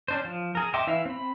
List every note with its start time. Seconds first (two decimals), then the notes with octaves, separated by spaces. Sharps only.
0.08 C#4 D4 C5
0.25 F3
0.55 G#4 A#4
0.74 D#5 E5 G5 C6 D6
0.87 E3 E4 E5 F5
1.06 C4 B5